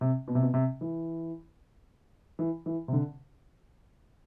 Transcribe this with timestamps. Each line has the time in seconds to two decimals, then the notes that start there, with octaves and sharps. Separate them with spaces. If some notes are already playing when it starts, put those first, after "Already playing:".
0.01 C3
0.28 B2
0.35 C3
0.43 B2
0.54 C3
0.81 E3
2.39 E3
2.66 E3
2.88 C3
2.93 D3